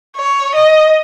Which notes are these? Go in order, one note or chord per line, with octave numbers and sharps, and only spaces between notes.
C#5
D#5